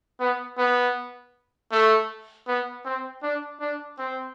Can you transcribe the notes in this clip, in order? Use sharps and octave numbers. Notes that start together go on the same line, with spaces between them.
B3
B3
A3
B3
C4
D4
D4
C4